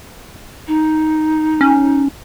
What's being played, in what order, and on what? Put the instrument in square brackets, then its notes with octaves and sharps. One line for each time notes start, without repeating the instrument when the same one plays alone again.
[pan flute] D#4
[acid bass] C#4